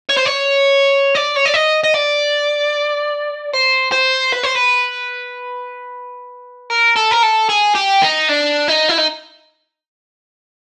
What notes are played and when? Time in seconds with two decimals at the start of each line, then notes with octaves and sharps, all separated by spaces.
0.10 C#5
0.17 C5
0.26 C#5
1.15 D5
1.36 C#5
1.46 D5
1.54 D#5
1.84 D#5
1.95 D5
3.53 C5
3.92 C5
4.33 B4
4.43 C5
4.55 B4
6.70 A#4
6.96 A4
7.11 A#4
7.23 A4
7.50 G#4
7.75 G4
8.02 D#4
8.29 D4
8.68 D#4
8.89 E4
8.98 D#4